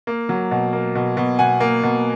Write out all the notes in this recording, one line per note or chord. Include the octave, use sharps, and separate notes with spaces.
A#3
F#3
B2
A#3
B2
B2
B2 F#5 G#5
A#3
B2